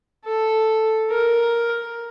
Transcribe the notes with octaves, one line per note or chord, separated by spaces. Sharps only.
A4
A#4